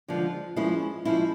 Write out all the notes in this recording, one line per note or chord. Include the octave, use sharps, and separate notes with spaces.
D3 F3 G#3
F3 G#3 C#4 E4
F3 G#3 C#4 E4